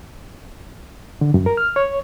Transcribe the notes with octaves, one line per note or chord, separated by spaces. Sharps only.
D3
F#2
A#4
F6
C#5